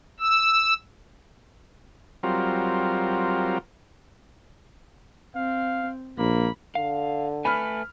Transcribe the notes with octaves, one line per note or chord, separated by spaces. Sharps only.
E6
F#3 G3 C4 F4 A#4
C4 F5
A#1 A#3 B5
D3 F5
A3 B4 G#5 B5 F6